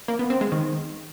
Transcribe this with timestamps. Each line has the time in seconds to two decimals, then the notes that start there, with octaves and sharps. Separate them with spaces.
0.08 A#3
0.19 B3
0.30 C4
0.41 G#3
0.52 D#3